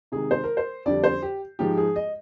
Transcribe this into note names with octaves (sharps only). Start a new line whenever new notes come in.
C3 D#3 G#3 G#4
C5
A#4
C5
F2 D3 G3 D5
C5
G4
G#2 F3 G#3 G4
G#4
D#5